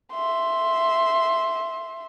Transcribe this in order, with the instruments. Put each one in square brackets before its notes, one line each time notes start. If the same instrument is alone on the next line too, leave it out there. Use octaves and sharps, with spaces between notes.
[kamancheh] E5 C6